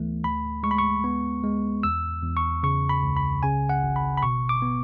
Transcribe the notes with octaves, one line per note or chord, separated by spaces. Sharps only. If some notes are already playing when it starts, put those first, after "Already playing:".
Already playing: D2 E3 A3 B3
D2 B5
G#3 C#6
B5
C#6
B3
G#3
E2 E6
E2
C#6
C#3 C#6
B5
C#2
B5
C#3 G#5
F#5
G#1
B5
B5
B2 C#6
D6
B3